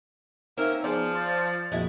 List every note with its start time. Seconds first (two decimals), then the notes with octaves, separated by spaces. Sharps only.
0.58 A#3 C4 C#4 D#4 A#4 E5 E6
0.84 F3 B3 G#4 C5 D5
1.15 C6 A6
1.72 A#1 F2 A#2 G#3 E4 F#4